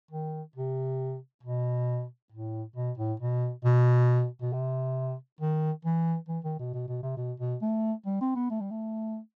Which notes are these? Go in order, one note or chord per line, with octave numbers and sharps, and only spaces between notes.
D#3
C3
B2
A2
B2
A2
B2
B2
B2
C3
D#3
E3
E3
D#3
B2
B2
B2
C3
B2
B2
A3
G3
C4
B3
A3
G3
A3